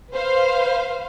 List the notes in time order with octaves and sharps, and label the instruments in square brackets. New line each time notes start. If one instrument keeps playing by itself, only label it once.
[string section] B4 C5 F5